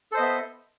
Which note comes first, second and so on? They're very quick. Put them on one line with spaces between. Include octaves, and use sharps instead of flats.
A4 C5 D#5 B3 E5